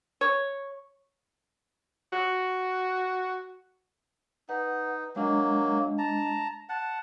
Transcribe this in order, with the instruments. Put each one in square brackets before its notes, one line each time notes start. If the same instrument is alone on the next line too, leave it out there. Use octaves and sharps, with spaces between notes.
[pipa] C#5
[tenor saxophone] F#4
[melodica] D#4 [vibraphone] B4 F#5
[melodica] F#3 A#3 [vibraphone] G#3 D4 D#5
[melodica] A5 A#5
F#5 A5